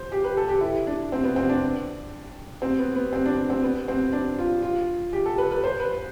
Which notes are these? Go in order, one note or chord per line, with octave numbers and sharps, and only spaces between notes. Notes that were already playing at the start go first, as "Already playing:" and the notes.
Already playing: C5
G4
B4
A4
G4
E4
D4
C4
B3
C4
D4
C4
B3
B3
C4
D4
C4
B3
C4
D4
F4
F4
G4
A4
B4
B4
C5
B4